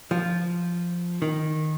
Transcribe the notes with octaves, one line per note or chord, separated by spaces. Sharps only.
F3
D#3